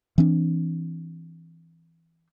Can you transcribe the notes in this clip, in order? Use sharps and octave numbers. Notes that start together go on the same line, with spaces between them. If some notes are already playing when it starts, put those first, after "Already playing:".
E3 C4 D4